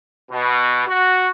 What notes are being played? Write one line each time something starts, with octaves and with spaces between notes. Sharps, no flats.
B2
F#4